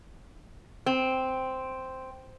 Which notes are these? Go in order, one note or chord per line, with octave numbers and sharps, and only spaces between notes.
C4